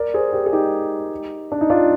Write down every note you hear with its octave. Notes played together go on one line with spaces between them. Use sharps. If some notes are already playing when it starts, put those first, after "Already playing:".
Already playing: A#4 D5
G#4 C5
G4 A#4
G#4
D#4 G4
D4
D#4
D4 F4